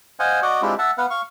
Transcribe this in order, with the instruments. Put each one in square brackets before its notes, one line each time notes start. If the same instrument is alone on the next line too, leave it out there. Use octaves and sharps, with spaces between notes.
[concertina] C5 D#5 F5 F#5 G#5
F#4 D5 D#5 F#5
G#3 C4 D4 E4 F4 G4
E5 F#5 A5
B3 B4 F5 F#5
F5 C#6